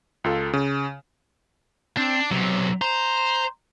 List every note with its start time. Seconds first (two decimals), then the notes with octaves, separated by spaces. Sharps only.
0.24 C#2 F4 A4
0.53 C#3
1.97 C4 D4
2.31 B1 C3 F#3
2.82 C5 A#5